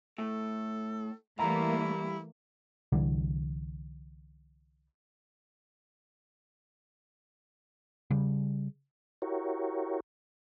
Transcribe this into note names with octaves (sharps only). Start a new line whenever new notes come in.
A2 A4
E3 G3 A3 A#3 E4 A#5
C2 D3 E3 G3
C#3 G3
E4 F#4 G4 A#4 C#5